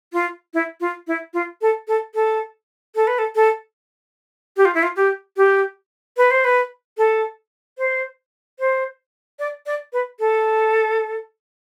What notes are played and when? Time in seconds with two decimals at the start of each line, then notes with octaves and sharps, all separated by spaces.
0.13 F4
0.54 E4
0.80 F4
1.07 E4
1.34 F4
1.61 A4
1.88 A4
2.15 A4
2.96 A4
3.07 B4
3.19 A4
3.35 A4
4.57 G4
4.65 F4
4.75 E4
4.83 F4
4.96 G4
5.37 G4
6.17 B4
6.31 C5
6.44 B4
6.98 A4
7.78 C5
8.59 C5
9.39 D5
9.66 D5
9.93 B4
10.20 A4